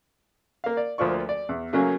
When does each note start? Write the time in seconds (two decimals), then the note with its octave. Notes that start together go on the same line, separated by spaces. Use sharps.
0.64 A#3 F5
0.77 D5
0.98 D2 F3 A#3 F4 D5 C#6
1.29 D5
1.49 E2
1.73 C#3 F#3 A3 A#3 C#4 G#4